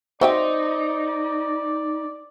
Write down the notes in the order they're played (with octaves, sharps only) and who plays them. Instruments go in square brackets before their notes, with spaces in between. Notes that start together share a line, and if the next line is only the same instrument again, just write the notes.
[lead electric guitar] D#4 [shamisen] F#4 E5 G5 [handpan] C5 [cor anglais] D5